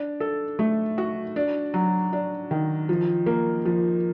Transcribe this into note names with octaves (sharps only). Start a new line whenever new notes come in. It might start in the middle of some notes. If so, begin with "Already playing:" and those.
Already playing: D4
A4
A3
F#4
D4
F#3
D4
D#3
F3
A#3
F3